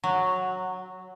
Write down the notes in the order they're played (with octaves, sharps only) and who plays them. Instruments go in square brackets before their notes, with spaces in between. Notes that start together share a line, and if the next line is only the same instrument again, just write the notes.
[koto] F#3